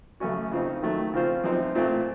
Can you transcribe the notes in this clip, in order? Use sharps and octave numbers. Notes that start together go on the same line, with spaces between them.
F#2 C#3 A3 C#4 F#4
C#3 F3 C4 D#4
D#3 F#3 A3
C#3 F3 C4 F4 C5
F#2 F3 C4 D#4
A#2 A3 C4 F4